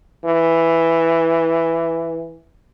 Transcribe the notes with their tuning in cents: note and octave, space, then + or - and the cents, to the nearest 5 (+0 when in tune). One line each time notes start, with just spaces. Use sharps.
E3 +5